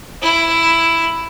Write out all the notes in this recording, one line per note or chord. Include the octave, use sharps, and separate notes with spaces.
E4